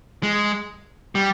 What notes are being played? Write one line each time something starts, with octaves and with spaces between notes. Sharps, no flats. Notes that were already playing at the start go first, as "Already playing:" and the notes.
G#3
G3